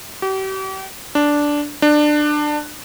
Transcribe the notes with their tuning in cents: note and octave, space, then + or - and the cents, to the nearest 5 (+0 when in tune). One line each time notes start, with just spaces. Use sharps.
G4 -40
D4 -5
D4 +20